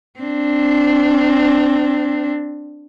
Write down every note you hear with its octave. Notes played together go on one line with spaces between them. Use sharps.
C4 D4